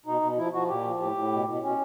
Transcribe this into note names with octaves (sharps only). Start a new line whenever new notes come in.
B2 D#4
B2
F3 E4
F3 F#4
A#2 G4
F3
A2 G4
A2
B2
B2
B2 C#4